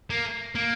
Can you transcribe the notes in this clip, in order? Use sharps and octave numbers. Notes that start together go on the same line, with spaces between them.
A#3
A#3